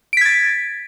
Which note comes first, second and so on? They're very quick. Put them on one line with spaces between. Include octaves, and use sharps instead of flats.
D7 B6 G#6 A6